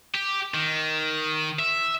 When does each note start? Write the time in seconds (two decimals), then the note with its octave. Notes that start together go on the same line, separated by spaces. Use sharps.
0.15 G4
0.54 D#3
1.59 E5